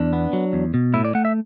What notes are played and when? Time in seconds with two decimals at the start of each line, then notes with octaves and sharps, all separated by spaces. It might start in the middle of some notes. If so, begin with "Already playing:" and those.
Already playing: E2 D4
0.13 B3
0.33 F#3
0.53 E2
0.74 B2
0.94 A2 E4
1.05 D5
1.15 A3 F#5
1.25 E5